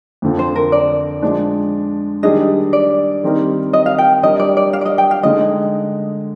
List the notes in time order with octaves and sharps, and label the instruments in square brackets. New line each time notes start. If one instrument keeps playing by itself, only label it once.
[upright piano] F2 D3 F3
[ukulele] C5
A#4
D5
[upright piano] F3 G#3 D4
[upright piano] D#3 G3 D4 G#4 [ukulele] D#5
[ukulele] D5
[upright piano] D#3 G3 C4 D#4 A#4
[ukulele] D#5
F5
G5
[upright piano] G3 D4 G4 A#4 [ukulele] D#5
[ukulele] D5
D5
F5
D5
D#5
G5
F5
[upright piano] D3 G#3 D#4 [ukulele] D#5